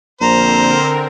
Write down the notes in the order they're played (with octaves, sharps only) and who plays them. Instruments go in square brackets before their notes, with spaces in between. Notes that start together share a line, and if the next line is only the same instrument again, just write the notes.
[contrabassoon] A#1 [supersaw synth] D3 C4 A#4 [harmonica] C5 [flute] A#5